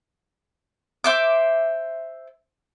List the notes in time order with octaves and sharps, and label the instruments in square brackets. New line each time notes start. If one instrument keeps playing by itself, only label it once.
[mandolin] C5 E5 D6